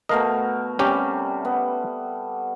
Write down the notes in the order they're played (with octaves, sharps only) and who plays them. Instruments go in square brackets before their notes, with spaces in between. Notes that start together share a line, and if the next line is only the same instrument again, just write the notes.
[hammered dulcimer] B2 A3 A#4 [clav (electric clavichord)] D#5 F5
[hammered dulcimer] C3 G3 [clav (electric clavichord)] C#4 G4
[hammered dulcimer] B3